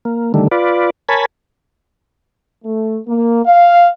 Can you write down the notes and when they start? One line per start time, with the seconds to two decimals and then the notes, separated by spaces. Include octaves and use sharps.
0.05 A#3
0.34 D3 D#3 G3 A3
0.51 F4 B4 D5
1.09 A#4 C#5 G#5 A5 B5
2.65 A3
3.07 A#3
3.46 F5